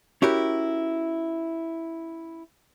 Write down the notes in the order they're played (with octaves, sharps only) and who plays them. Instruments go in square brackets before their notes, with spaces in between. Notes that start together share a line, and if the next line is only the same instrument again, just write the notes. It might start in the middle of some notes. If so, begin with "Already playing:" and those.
[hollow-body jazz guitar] C#4 E4 F#4 G4 A#4